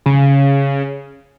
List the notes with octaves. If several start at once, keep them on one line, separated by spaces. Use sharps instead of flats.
C#3